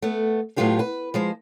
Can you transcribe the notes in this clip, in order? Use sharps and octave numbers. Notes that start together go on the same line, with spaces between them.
A3 B3
A2 F#3 B3 F4 G4 G#4
B4
F3 G#3 C5